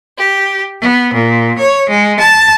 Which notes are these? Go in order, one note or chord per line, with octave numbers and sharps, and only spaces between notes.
G4
B3
A#2
C#5
G#3
A5